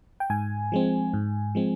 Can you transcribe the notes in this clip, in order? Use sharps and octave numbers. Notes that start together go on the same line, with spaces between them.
G5
G#2 G#5
F3 G#3 C4
G#2
F3 G#3 C4